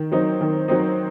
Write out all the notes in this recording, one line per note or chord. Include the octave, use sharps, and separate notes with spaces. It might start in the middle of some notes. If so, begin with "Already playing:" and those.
Already playing: D#3
F#3 C4 D#4
D#3
F#3 C4 D#4